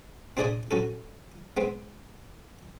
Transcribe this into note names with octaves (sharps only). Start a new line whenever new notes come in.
C4 D4 G#4 D5 D#5 G#5
F#3 C#4 A4
G#3 B3 C4